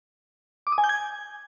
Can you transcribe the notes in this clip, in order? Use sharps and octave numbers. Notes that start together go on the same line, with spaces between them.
D6
D#6
G#5
G6
G#6